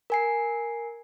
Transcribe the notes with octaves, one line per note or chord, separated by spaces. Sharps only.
A#4 G#5 C7